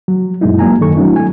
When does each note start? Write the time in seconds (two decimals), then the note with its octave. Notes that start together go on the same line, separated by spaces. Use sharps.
0.08 F#3
0.41 F#2 A#2 F#3 G#3 D#4 E4
0.59 F#3 A#3 G#5 A#5
0.80 F#2 D#3 D#4 A4 C#6
0.97 F#3 A3 C4 D4 E4
1.16 G#5